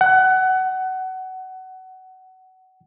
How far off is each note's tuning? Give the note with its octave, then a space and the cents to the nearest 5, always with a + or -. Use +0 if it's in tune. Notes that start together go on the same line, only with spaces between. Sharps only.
F#5 +20